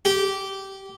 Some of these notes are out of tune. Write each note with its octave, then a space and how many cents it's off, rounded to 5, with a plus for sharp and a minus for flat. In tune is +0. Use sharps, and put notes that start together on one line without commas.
G4 -15